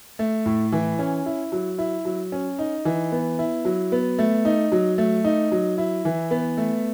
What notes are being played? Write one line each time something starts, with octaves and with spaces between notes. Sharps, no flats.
A3
A2
E3
C#4
E4
F#3
E4
F#3
C#4
D#4
E3
B3
E4
F#3
B3
A3
D#4
F#3
A3
D#4
F#3
E4
E3
B3
A3